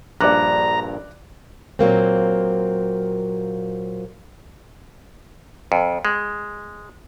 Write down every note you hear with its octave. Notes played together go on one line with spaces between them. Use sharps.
A#1 G2 D5 A#5 D6 F#6
A#2 F#3 A#3 C4
F2
G#3